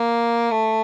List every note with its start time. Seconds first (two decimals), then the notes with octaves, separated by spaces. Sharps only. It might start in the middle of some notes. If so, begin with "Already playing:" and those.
Already playing: A#3
0.51 A3